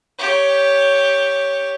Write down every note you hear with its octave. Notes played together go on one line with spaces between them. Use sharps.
G4 C#5